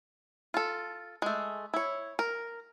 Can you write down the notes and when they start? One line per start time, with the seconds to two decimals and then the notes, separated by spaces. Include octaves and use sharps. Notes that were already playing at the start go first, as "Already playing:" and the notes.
0.54 F4 A4
1.22 G#3 A3
1.74 E4 C#5
2.19 A#4